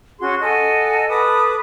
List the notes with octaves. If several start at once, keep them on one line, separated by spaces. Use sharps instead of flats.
C#4 F#4 G#4 C6
A4 D#5 F#5 G#5
A4 B4 D6 D#6